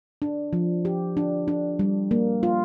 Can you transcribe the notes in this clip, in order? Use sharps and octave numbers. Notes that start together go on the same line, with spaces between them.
D4
F3
G4
D4
D4
G3
A#3
F4